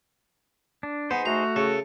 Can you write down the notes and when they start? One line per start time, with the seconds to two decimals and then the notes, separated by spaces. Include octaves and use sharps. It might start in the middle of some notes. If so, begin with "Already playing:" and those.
0.83 D4
1.11 B3 D#4 G#4 C5
1.25 A3 F#4 A#5
1.56 C#3 A4